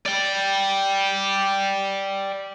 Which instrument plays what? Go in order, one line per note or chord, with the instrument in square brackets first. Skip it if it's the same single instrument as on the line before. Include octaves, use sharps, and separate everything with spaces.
[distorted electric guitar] D5 G5